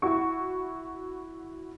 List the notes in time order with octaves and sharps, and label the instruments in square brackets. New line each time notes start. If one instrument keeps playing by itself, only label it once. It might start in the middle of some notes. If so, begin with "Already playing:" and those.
[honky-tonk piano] E4 F#4 C#6